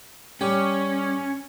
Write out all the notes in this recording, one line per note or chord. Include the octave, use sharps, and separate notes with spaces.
G3 C#4 G4